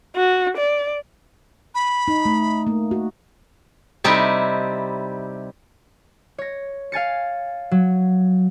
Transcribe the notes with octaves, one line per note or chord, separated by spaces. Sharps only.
F#4
D5
B5
D#4
A3
A3 A#3
F#4
C3 G3 C4 D#4 E4
C#5 A#6
F5 G#5 A6 C#7
F#3